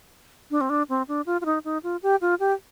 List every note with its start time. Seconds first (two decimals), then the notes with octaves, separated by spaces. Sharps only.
0.51 D4
0.61 C4
0.70 D4
0.89 C4
1.08 D4
1.26 F4
1.41 F4
1.45 D#4
1.65 D#4
1.83 F4
2.03 G4
2.21 F4
2.40 G4